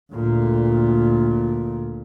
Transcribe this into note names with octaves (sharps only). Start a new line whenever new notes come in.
D2 A#2